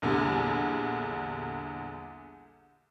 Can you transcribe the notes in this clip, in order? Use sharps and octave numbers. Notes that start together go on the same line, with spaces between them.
A#1 E2 D3 G3